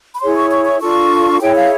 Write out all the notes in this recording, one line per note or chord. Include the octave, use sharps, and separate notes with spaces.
B5
E4 G#4 C#5 C6
C#6
C#6
C#6
D4 F4 A4 C#6
E4 G#4 C#5 G5
F5